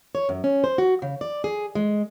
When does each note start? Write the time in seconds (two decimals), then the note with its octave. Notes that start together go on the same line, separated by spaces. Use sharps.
0.15 C#5
0.29 F#2
0.44 C#4
0.64 C5
0.78 F#4
1.02 C#3
1.21 D5
1.44 G#4
1.75 G#3